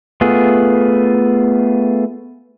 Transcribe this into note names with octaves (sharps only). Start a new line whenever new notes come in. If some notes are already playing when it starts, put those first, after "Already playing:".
A3 B3 F4 G#4